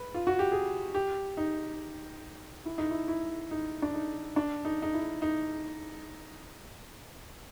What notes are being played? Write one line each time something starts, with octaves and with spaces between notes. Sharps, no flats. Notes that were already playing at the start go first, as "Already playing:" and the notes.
Already playing: B4
F4
F#4
G4
G#4
G4
D#4
E4
D#4
E4
E4
D#4
D4
D#4
D4
D#4
D#4
E4
D#4